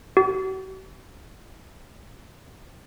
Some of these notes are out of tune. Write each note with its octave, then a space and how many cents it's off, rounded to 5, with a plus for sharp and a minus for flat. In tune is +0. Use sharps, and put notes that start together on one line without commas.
F#4 +45